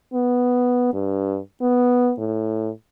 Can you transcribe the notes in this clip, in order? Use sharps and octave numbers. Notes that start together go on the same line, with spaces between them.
B3
G2
B3
A2